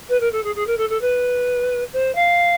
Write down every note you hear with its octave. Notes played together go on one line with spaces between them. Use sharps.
B4
A#4
A4
G#4
G#4
A#4
A4
A4
B4
C5
F5